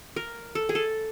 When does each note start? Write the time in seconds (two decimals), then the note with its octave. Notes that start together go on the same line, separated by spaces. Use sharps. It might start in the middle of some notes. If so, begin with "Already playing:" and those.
0.16 A#4
0.55 A4
0.69 G#4
0.75 A4